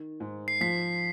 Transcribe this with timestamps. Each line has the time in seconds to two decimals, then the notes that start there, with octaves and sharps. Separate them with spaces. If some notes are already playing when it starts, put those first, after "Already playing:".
Already playing: D#3
0.20 G#2
0.48 C7
0.61 F3 B6